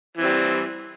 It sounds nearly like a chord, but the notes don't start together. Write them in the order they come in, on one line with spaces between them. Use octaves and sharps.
E3 C4 G3